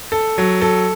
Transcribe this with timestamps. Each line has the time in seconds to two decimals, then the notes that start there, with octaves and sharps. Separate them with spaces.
0.12 A4
0.38 F#3
0.62 A4